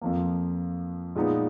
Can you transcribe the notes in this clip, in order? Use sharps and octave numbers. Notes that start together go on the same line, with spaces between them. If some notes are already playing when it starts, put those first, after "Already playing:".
F2 F3 A#3
A#2 G#3 B3 D#4